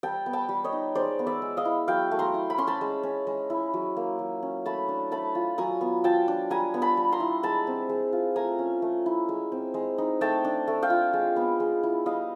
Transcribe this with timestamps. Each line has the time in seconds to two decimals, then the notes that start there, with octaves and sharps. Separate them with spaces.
0.03 G3 G5 A5
0.26 B3
0.33 G5 A5
0.49 G3
0.64 C#5 D#5
0.73 D#4
0.95 G#3 C5 D5
1.19 B3
1.27 D5 E5
1.42 G#3
1.57 D#5 F5
1.65 E4
1.88 F#3 F5 G5
2.11 A3
2.19 A#5 C6
2.34 E4
2.50 B5
2.58 C#4 C6
2.67 A5 B5
2.81 G#3
3.03 C#4
3.27 G#3
3.50 E4
3.74 F#3
3.97 A#3
4.19 F#3
4.42 C#4
4.66 A3 A5 B5
4.89 D4
5.11 A3 A5 B5
5.35 F4
5.58 F#3 G#5 A#5
5.81 B3
6.04 F4 G5 A5
6.28 D4
6.50 G3 G#5 A#5
6.74 B3
6.82 A5 B5
6.97 G3
7.12 A#5 C6
7.20 E4
7.43 G#3 A5 B5
7.67 C4
7.89 G#3
8.13 F4
8.36 A3 G#5 A#5
8.59 C#4
8.82 A3
9.06 E4
9.29 G#3
9.52 C4
9.74 G#3
9.98 D#4
10.21 A3 G5 A5
10.45 D4
10.68 A3
10.83 F5 G5
10.90 F4
11.13 G#3
11.36 B3
11.60 G#3
11.83 E4
12.05 G3 D#5 F5